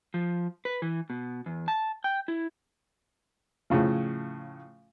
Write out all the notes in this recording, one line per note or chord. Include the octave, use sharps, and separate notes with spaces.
F3
B4
E3
B2
E2
A5
G5
E4
A2 C#3 F3